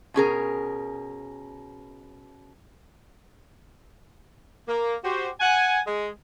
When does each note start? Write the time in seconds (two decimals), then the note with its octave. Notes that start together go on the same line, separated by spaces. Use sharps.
0.14 B2 C#4 G#4 A#4
4.67 A#3
5.03 F#4 G4 C5
5.40 F#5 G#5
5.86 G#3